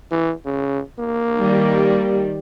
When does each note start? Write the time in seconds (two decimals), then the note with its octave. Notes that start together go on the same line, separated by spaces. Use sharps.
0.11 E3
0.45 C#3
1.00 A#3
1.37 D#3 G3